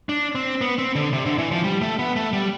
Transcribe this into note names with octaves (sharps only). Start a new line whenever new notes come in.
D4
C4
B3
C4
D3
C3
D3
E3
F3
G3
A3
B3
A3
G3